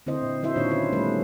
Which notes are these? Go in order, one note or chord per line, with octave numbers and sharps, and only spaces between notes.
D3 C4 E4 C5 D#5
A#2
F#3 E4 C5 E5
A#2 D#3 D4 D#4 F4 C#5
D3 C#4 D4 F4 B4
G3 A3 B3 C#4 B4